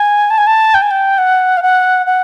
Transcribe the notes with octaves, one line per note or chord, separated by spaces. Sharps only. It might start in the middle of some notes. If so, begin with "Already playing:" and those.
Already playing: G#5
A5
G#5
A5
G5
G#5
G5
F#5
F5
F#5
F#5